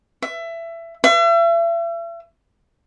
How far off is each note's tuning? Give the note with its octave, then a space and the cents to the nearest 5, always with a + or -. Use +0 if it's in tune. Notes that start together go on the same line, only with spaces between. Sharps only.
E5 +20
E5 +40